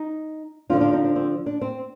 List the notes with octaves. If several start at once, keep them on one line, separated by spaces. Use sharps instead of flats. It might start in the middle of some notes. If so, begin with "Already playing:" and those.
Already playing: D#4
D3 F3 C4 D4 F4
D4 F4
C4 D#4
D4
C4
D4
C4